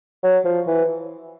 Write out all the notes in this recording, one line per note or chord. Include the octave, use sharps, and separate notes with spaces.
F#3
F3
E3